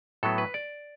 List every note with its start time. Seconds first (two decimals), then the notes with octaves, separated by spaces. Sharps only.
0.23 A2 F#3 B3 A4
0.38 B4
0.54 D5